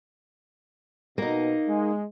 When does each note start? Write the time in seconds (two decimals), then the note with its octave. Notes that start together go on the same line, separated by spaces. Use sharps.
1.18 B2 A#3 D#4
1.68 G#3